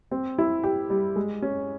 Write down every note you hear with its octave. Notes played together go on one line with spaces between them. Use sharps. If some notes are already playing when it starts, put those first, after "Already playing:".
C4
E4
G4
G3
G#3
C#4